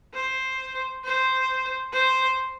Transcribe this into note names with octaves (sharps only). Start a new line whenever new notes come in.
C5
C5
C5